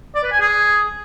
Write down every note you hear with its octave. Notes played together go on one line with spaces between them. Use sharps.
D5
B4
G#5
G#4